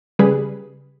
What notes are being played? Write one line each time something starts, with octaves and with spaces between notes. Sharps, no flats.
C#3 G3 G#4 B4